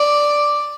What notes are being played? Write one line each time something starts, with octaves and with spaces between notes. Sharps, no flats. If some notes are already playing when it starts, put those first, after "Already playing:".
Already playing: D5